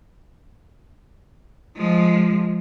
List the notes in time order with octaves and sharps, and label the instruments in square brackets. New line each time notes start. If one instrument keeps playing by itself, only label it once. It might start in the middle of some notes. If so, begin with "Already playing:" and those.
[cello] F3 G#3